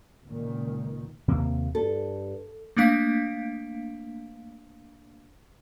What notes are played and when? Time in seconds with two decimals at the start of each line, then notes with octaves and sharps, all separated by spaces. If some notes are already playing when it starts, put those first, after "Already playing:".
0.25 C#2 A#2 D#3
1.28 D#2 C3 A#3
1.75 G2 A4
2.77 A3 A#3 D4 F5 B6 D7